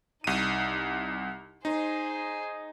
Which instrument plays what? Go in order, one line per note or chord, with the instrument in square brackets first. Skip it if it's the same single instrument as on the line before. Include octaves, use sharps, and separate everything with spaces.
[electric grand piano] C2 D#7 [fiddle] D#4
[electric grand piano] D#4 [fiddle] G#4 C5